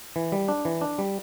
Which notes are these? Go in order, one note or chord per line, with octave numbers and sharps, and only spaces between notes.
E3
G3
D4
E3
D4
G3